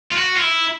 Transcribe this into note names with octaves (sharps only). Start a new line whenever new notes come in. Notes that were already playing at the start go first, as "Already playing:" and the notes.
F4
F#4
F4
E4